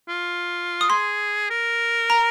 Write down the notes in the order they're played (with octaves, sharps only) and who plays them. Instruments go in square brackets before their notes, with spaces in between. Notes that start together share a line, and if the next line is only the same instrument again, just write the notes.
[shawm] F4
[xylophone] D#6
[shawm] G#4 [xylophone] C6
[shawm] A#4
[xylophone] A#5